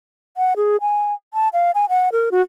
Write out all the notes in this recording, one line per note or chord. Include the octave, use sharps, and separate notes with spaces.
F#5
G#4
G#5
A5
F5
G#5
F#5
A#4
F#4